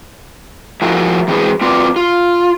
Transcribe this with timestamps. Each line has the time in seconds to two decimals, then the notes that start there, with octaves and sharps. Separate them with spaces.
0.82 F3 E4 F#4 G#4 A#4 E5
1.28 E3 G#3 C4 F#4 G#4 B4
1.61 C4 F4 F#4 B4 D5
1.96 F4